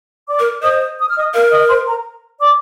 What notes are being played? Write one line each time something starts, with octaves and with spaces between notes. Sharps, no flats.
D5 D6
A#4
C5 D#5 D#6
D#6
F6
D#5 D#6
A#4 F5 F6
D#5 D#6
C5 C6
A#4 A#5
D5 D6